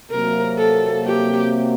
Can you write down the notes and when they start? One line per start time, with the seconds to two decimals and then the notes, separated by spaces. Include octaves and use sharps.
0.11 C3 F#3 A#3 A#4
0.58 A4
1.06 G4